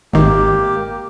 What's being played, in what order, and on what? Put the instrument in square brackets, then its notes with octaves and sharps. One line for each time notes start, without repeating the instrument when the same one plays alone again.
[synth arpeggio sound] G#1 D#3 [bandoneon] A#3 G4